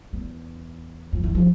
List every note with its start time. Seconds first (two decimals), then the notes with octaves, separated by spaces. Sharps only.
0.13 E2
1.13 F2
1.23 E3
1.35 F3